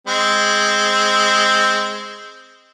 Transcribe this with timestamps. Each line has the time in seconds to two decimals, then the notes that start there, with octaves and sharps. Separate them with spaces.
0.07 G#3 C4